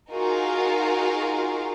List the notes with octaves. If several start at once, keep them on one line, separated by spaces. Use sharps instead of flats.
D#4 F4 F#4 G#4 A#4 F5